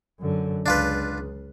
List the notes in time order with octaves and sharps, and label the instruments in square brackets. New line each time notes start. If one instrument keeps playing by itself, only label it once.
[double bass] F#2 D3
[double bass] C#2 [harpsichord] D4 F4 B4